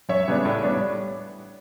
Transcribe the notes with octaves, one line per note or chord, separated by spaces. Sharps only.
F#2 C#5 E5
C#3 G3 B3 D4
A2
G3 B3 D4